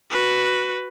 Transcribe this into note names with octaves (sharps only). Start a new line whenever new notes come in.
F#4 B4